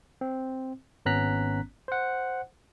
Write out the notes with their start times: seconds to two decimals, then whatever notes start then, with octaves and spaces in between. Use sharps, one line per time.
0.21 C4
1.06 G#1 B3 C#4 A#5 F#6 B6
1.88 C5 F#5